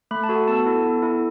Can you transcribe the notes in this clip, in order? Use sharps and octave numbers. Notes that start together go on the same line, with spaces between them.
A3 B5
A5
F#4 A4
F#5
B3 A5
E4 A4
B3
E4 A4